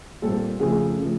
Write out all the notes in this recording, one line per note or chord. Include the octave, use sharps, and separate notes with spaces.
A#2 G3 C4 A4
F2 C#3 F3 A3 G#4
C#3 F3 A3